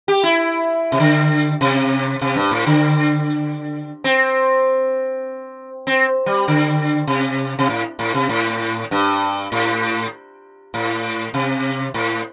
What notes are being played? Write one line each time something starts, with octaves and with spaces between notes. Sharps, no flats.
G4
E4
C3
D3
C3
C3
G2
A2
D3
C4
C4
G3
D3
C3
C3
A2
A2
C3
A2
G2
A2
A2
C3
A2